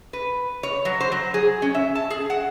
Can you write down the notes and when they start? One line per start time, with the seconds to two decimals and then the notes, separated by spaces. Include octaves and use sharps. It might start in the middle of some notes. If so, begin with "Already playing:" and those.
0.13 B4
0.63 C#5
0.85 F#3
1.00 C5
1.12 F#3
1.34 G#4
1.62 C#4
1.75 E5
1.95 A5
2.10 G#4
2.30 F#5